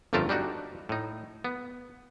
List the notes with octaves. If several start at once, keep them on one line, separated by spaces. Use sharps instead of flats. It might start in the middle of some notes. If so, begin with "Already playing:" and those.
G1 F2 A3 F4 A#4 A5
G3 D4 D#4 F#4
A2 D#4
B3